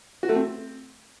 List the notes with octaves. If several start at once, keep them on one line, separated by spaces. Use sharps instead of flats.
F#4
A3
C4